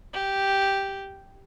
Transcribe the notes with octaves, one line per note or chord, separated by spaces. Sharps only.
G4